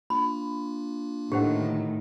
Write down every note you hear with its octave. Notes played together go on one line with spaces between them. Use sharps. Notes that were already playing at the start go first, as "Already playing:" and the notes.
A#3 D4 F4 B5
A2 D3 D#3 G4 C5 F#5